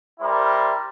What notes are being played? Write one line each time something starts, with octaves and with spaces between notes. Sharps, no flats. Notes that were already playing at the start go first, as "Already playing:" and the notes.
G3 E4 A#4 C5